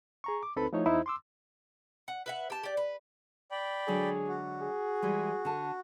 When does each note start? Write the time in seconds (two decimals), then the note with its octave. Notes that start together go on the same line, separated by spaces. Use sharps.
0.24 G#4 A#5 C#6
0.43 D6
0.56 D2 C4 D#4 A4 B4 B5
0.73 F3 A3 D#4 E4 C#5
0.86 E2 D#4 E4 C5
1.06 C6 D6 E6
2.08 F#5
2.26 B4 E5 F#5
2.50 G4 A5
2.63 G4 D5
2.77 B4
3.51 D5 G5 B5
3.88 D3 F#3 G#3 G#4
4.28 F#4
4.62 G#4
5.02 E3 G3 G#3
5.45 D3 A5